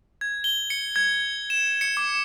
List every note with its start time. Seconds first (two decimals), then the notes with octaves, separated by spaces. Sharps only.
0.21 G#6
0.44 G7
0.70 C#7
0.96 G#6
1.50 E7
1.81 C#7
1.97 D6